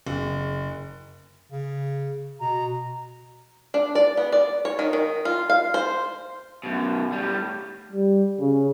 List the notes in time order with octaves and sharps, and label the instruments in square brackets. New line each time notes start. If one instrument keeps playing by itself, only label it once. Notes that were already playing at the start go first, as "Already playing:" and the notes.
[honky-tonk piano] F#1
[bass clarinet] C#3
[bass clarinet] B2 [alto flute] A#5
[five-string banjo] D4
D5
B3
D5
C#5
D#3
D#3
F4
F5
C5
[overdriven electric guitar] F#2 B2
A2 G3
[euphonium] G3
C#3